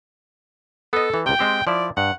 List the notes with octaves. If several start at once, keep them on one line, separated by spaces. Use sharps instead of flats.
B3 A4 D#5
E3
C#2 C3 G5
G#3 C4 G4
F3 E4 D5
G2 F#5